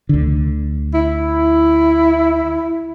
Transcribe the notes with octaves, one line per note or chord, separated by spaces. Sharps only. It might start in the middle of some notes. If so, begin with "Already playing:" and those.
D2 D3
E4